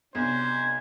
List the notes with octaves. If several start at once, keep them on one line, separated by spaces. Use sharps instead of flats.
B1 C3 D4 C5 G#6